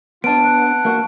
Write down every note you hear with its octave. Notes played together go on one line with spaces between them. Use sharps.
B3 D4 F4 A5 D7
F#5
A#3 F#4